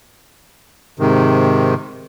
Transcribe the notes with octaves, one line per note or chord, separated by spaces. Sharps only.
G#2 C3 D#3